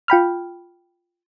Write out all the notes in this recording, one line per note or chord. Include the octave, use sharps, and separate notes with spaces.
F4 G5 B5 F6